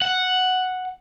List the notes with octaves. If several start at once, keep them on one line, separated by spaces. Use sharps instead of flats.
F#5